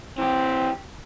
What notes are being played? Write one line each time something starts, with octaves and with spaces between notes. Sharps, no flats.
E3 C4 G4